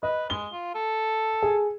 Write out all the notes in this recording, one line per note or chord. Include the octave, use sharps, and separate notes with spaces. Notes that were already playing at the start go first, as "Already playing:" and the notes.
B4 D#5
G#3 G7
F4
A4
G#4